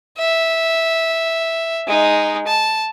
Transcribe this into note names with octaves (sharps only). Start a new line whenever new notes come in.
E5
G#3 D#4
A5